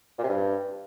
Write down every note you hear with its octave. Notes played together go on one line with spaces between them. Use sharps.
A#2
C3
G2